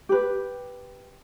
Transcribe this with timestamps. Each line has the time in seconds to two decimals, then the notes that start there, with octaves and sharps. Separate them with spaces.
0.09 G4 B4